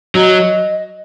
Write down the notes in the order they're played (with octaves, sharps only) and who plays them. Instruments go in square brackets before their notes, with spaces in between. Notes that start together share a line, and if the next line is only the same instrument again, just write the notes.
[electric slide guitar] F#3 [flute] D#5